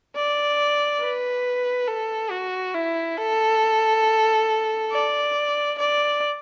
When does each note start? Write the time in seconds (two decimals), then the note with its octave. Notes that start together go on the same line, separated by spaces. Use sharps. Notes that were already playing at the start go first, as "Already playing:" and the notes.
0.16 D5
1.01 B4
1.88 A4
2.31 F#4
2.75 E4
3.17 A4
4.91 D5
5.78 D5